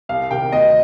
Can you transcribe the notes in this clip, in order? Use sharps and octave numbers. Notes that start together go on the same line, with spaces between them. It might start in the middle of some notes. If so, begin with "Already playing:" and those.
C2 F5
C3 D#3 G5
D2 D#5